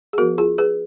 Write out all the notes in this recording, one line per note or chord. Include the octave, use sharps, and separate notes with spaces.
G#4
F3 B3 F#4 A#4
F4 G#4
G#4 B4